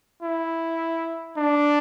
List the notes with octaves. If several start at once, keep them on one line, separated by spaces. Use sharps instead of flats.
E4
D4